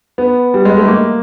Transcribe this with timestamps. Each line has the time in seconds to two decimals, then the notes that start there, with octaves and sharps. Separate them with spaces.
0.18 B3
0.54 G3
0.65 G#3
0.77 A3
0.88 A#3